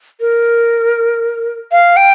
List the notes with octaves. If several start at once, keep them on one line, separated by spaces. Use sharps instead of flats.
A#4
F5
G5